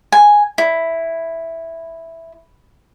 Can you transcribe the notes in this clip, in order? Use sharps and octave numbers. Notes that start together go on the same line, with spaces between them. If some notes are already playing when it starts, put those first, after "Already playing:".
G#5
E4